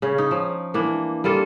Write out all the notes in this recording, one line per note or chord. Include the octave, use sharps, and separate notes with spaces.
C#3 C#4
D#4
F3
E3 A#3 D4
G3 A#3 F4 A4